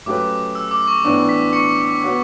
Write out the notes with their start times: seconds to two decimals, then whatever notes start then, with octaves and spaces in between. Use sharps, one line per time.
0.06 F#3 A3 C#4 G4 B4 D6
0.55 E6
0.71 D6
0.88 C#6
1.04 A2 E3 B3 D4 C#6
1.29 B6
1.53 C#6 C#7
2.02 B3 F#4 C#5